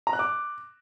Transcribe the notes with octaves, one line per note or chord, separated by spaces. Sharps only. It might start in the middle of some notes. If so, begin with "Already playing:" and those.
A#5
F#6
D6